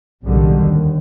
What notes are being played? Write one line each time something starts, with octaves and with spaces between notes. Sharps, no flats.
B1 D3 D#3 G3
D#2